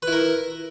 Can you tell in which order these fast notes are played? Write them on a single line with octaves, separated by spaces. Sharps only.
B4 E4 A#4